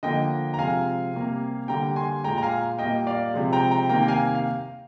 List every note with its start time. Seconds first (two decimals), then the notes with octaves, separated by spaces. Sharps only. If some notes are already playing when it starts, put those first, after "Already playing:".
0.03 D3 F3 A#3 D#5 G5
0.54 A#5
0.59 C3 F3 G#3 F5 G#5
1.13 C3 G3 A#3
1.68 D3 G3 A#3 G5 A#5
1.96 G#5 C6
2.24 A#2 G#3 G5 A#5
2.38 A#5
2.42 F5 G#5
2.79 A#2 G3 A#3 D#5 G5
3.07 D5 F5
3.34 C3 F3 G#3
3.53 G5 A#5
3.71 G5 A#5
3.89 C3 D#3 G3 A#3 G5 A#5
4.03 G5
4.08 F5 G#5
4.35 F5